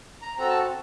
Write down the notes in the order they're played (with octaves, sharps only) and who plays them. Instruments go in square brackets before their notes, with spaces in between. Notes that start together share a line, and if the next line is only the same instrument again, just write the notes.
[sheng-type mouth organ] A#5
C4 F#4 A4 A#5
A5